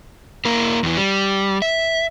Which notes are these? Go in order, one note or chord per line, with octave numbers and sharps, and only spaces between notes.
A#3 E4 A#4
E2 E3
G3
E5